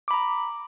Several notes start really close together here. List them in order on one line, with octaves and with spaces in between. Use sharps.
D6 B5 A#5